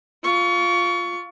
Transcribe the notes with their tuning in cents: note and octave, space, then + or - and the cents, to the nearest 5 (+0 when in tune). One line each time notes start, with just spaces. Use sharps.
F4 +0 C#6 +25